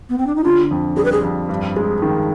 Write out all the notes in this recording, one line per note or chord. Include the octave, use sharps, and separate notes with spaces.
B3
C4
D4
D#4
D3 F4
F2
G3 G#4
B4
G#4
F2
G2
G#3
D#3